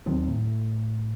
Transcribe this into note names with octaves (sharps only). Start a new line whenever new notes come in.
D#2 D#3 F#3 C4
A2